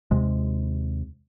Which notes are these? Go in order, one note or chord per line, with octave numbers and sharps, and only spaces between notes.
D#2 C3 G#3